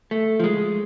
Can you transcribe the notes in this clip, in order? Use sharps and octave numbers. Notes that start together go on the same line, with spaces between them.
A3
F3
G#3